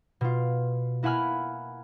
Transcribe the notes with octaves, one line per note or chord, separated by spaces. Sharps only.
B2 F4
A#3 E4 F#5 G#5 B5 F6